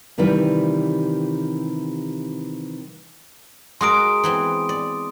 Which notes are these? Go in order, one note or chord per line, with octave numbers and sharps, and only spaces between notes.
C3 D#3 E3 G3 B4
G#3 F#4 A#4 C6 D#6 D7
E3 B3 C4
D5